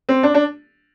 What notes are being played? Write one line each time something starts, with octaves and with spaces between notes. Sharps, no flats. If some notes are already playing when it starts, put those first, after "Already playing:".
C4
D4
D4